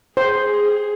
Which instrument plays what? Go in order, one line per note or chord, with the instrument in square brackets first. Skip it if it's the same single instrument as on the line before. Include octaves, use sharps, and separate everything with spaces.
[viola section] G#4 [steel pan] C5